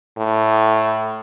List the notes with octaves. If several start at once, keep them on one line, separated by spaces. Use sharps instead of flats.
A2